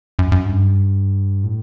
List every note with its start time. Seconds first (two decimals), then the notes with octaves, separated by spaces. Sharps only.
0.19 F#2
0.32 F#2
0.46 G2
1.44 A2